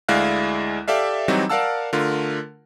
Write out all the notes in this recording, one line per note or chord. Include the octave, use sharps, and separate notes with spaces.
D2 G#3 E4 D5 F5 F#6
G4 A4 D5 E5 F5
E3 F#3 G3 C4 D#4 F#4
A#4 D5 F5 F#5 A5 E6
D3 A3 F4 A#4